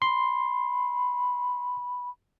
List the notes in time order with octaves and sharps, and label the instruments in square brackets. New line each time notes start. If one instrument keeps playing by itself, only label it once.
[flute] B5 [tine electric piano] C6